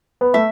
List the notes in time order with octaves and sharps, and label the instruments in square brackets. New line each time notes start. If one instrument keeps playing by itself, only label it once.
[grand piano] B3
[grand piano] A3 [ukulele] E5